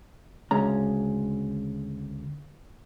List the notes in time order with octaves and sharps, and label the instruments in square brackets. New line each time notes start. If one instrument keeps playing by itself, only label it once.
[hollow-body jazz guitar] D2 C#3 G#3 C#4 A#5